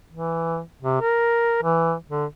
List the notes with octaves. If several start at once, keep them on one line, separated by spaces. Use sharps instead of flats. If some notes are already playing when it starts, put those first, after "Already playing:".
E3
C3
A#4
E3
D3